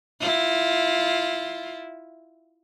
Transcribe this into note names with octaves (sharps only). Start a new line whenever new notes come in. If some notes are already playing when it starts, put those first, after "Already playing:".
E4 F4